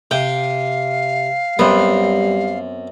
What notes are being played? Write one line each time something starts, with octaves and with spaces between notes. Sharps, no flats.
C3 F5 G5
F#2 G3 B3 C4